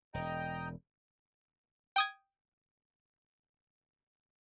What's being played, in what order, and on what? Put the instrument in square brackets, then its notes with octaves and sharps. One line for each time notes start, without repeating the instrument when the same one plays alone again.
[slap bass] E1 [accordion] D#5 G5 A#5
[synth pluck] G5 D#6 G#6